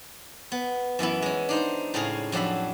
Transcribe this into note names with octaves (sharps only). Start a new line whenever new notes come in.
B3
F#2 E3 B3 E4
G#3 C#4
D4 D#4 C5
A2 C#3 G#3 G#4 F5
F2 F#3 D4 E5 B5